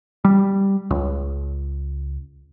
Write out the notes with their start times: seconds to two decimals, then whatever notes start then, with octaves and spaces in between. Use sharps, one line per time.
0.25 G3
0.91 C#2